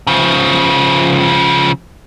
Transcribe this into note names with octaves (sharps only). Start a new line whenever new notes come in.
C#3 F3